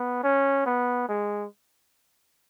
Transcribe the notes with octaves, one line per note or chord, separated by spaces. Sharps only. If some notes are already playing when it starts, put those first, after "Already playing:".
Already playing: B3
C#4
B3
G#3